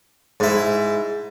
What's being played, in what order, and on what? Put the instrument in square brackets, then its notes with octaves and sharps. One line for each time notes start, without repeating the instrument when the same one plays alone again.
[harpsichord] G#2 E4